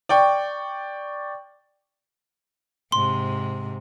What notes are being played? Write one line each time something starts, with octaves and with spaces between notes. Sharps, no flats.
D5 G5 C#6
G#2 C3 C6